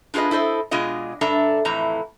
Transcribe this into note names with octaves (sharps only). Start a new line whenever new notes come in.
D4 F4 G#4 B4 D#5
E4 A4 C5 D#5
B2 G#3 D4 F4 D#5
G2 D4 A4 D5 E5 A#5
F2 A2 E3 A#5